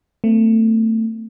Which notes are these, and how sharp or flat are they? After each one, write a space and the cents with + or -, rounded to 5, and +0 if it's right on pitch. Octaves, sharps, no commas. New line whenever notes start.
A3 +25 C4 -35